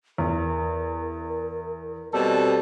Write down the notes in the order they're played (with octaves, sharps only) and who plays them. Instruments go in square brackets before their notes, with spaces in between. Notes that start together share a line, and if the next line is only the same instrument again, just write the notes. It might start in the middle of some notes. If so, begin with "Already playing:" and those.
[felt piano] E2 [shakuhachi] A#4
[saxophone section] B2 G3 C4 [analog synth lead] A4 [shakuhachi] D#5